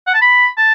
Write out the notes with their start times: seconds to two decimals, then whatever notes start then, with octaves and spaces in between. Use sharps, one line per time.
0.07 F#5
0.14 A5
0.21 B5
0.58 A5